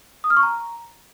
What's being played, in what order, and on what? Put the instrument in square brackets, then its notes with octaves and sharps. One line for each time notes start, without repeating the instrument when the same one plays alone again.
[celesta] D#6
F6
C#6
A#5